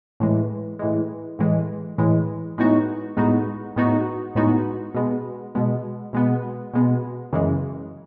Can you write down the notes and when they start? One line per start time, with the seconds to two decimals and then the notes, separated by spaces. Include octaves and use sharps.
0.20 A2 E3 G#3
0.79 A2 E3 G#3
1.39 A2 E3 G#3
1.98 A2 E3 G#3
2.58 A2 G#3 B3 D#4 F#4
3.17 A2 G#3 B3 D#4 F#4
3.76 A2 G#3 B3 D#4 F#4
4.35 A2 G#3 B3 D#4 F#4
4.94 B2 G#3 B3
5.55 B2 G#3 B3
6.13 B2 G#3 B3
6.73 B2 G#3 B3
7.32 F#2 C#3 E3 G#3